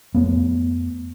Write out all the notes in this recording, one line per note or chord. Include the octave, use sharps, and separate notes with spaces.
F2 A3 B3